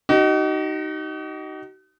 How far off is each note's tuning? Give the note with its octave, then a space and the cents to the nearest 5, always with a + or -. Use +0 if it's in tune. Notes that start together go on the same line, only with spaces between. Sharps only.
D#4 +0 F#4 +45